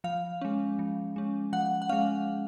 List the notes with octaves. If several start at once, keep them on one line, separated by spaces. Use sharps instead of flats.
F3 F5
G#3 C#4
F3
G#3 C#4
F3 F#5
F#5
G#3 C#4 F5